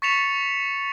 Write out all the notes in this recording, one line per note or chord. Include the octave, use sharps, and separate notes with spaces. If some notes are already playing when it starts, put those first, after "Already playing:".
C#6 A6 B6 C#7 E7 F7